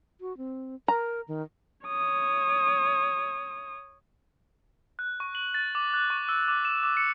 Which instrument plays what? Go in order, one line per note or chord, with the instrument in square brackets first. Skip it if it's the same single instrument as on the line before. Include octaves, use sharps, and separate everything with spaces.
[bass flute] F#4
C4
[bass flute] A#4 [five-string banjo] A#5
[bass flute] D#3
[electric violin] C#5 D#6
[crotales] F#6
C#6
F#7
A6
D6
F#6
C#6
E6
D6
E7
D6
C#7